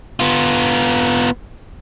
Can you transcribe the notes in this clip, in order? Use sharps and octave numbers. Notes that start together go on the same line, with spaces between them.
B3 F4